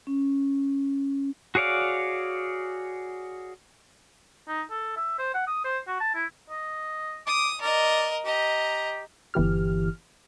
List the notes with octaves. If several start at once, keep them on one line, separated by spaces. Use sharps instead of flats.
C#4
F#4 G#4 C#5 D5 F5
D#4
A4
E5
C5
F#5
D#6
C5
F#4
A5
E4
D#5
D6 D#6
A#4 D5 D#5
G4 D#5 A#5
G1 E3 G4 F6